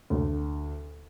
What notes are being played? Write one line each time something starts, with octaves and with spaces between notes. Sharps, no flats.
D2